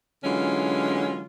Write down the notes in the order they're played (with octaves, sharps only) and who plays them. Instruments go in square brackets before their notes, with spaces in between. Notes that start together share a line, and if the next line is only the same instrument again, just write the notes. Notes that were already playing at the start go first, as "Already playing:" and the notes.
[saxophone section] D3 E3 F#3 G#3 C#4 F4